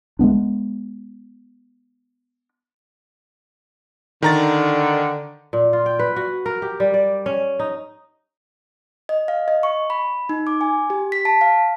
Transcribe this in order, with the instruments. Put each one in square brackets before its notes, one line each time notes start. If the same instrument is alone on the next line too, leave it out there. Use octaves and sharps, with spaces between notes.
[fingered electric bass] G#3 A#3 B3 D4
[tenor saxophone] D3 [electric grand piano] D#3 A#5 A6
[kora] A#2
F4
G5
B4
F#4
A#4
G4
G3
D5
C#4
D#4
[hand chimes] D#5
F5
D#5
C#6
B5
D#4
D6
G#5
G4
B6
A5
F5